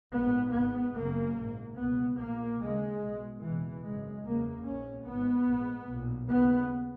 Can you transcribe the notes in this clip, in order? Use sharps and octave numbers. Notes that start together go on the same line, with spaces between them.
A#1 G#2 B3
G#1 G#2 B3
F#1 F#2 C#3 A#3
A#1 G#2
C#2 B2 B3
A#1 A#2 A#3
D#2 C#3 G#3
B1 B2
F#1 E2 B2 E3
G#1 F#2 C#3 G#3
F#1 E2 C#3 A#3
A#1 G#2 C#4
G#1 G#2 B3
A#1 G#2
B1 A#2
D#2 C#3 B3